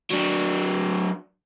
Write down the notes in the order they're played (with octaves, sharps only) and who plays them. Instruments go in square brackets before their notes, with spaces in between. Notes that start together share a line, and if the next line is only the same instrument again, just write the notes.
[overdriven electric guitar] F#3 D4